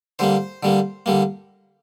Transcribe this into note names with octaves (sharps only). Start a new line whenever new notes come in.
D3 G3 A#3 C5
D3 G3 A#3
D3 G3 A#3